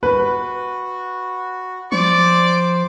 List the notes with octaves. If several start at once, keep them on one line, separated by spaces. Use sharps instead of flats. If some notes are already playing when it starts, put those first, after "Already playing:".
F#4 B4
F3 C5 D5 D6